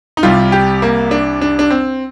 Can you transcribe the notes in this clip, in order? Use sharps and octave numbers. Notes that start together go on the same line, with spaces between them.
D#4
C2 C3 G3 F4
G4
A#3
D4
D4
D4
C4